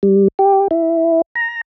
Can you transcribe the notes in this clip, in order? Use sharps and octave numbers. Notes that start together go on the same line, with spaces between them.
G3
G4
E4
A#5